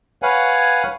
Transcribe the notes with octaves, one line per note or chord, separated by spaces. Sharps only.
B4 C#5 F5 F#5 G#5